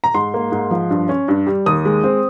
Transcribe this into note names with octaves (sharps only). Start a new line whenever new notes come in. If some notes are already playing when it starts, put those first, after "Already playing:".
A#5
G#2 C6
A#3
G#2
F3
G2
C#4
G2
G3
D#2 D#6
G#3
C4